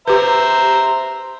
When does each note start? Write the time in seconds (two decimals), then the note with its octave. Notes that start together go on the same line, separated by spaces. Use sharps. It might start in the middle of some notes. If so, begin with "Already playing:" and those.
0.08 G4 B4 C5 E5 A#5